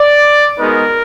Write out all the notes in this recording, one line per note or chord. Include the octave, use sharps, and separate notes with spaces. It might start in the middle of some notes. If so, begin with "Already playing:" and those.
Already playing: D5
G#3 B3 D#4 F#4 A#4